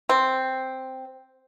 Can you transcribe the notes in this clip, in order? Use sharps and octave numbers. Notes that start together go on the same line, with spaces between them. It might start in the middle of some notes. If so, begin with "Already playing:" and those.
C4